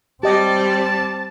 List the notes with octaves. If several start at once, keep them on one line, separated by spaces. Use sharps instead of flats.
G3 C4 G4 D5 D#5 A5